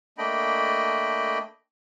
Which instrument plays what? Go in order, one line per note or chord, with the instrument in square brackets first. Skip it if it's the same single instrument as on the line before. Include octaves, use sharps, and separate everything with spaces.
[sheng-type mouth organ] A3 A#3 D4 D#5 G5 B5